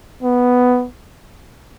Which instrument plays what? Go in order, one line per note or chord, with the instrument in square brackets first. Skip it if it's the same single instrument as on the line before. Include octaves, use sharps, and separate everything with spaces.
[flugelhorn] B3